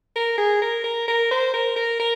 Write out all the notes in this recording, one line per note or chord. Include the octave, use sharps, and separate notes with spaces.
A#4
G#4
A#4
A#4
A#4
C5
A#4
A#4
A#4